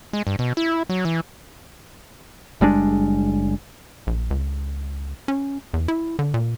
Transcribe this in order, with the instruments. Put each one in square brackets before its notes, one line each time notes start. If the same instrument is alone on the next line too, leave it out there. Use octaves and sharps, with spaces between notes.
[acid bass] G#3
G2
B2
E4
F#3
E3
[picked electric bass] F#1 G3 G#3 D4
[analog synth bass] A#1
C#2
C#4
E2
E4
D3
A#2